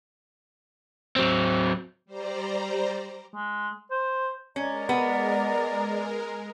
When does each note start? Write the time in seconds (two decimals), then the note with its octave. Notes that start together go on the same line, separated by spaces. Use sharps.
1.16 F#3 C4
2.05 G3 C5 D5 A#5
3.34 G#3
3.91 C5
4.56 G#3 C#4 A#4 D5 D#5 A#5
4.89 B3